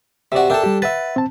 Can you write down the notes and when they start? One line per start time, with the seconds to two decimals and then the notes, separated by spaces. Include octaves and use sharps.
0.32 C3 F#4 D5 E5
0.50 D4 A4 A#4 E5 G5
0.63 G3 G4
0.82 B4 E5 F#5 A6
1.16 C4 A5